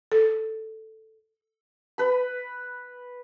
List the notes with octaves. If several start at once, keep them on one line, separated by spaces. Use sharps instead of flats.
A4
B4 B5